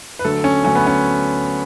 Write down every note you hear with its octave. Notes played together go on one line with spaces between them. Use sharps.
B4
D2 D3 F#3 A3 A4
C#4
D2 D3 F#3 A3 C#4
B3
C#4